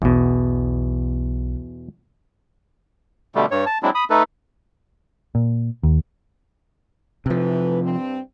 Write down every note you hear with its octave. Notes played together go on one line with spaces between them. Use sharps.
B1 E2 B2
B2 D3 G3 A3
G2 C#5
A5
F#3 G#3 C4 D4 E4
B5 D#6
A3 D#4 A4 B4
A#2
D#2
C3 E3 F3 A3 B4
G2 C4